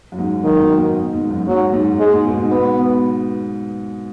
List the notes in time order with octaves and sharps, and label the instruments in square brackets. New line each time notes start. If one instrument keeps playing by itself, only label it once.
[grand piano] F#2
G#2
[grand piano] F#2 [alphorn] D#3
[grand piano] B2
G#2
G#2
F#2
[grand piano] G#2 [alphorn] F#3
[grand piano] G#2
[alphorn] G#3
[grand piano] G#2
B2
G#2
[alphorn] B3